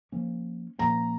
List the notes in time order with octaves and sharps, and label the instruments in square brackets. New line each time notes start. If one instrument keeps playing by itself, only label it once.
[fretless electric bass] F3 A#3 C#4
[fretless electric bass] A#2 F3 A#3 C#4 [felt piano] A#5